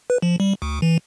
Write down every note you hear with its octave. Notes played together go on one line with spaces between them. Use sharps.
B4
F3
G3
D2
E3